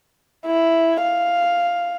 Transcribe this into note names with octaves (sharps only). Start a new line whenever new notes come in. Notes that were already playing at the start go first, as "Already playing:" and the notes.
E4
F5